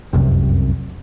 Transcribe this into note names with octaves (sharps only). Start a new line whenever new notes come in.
F1 C2 F#2 C3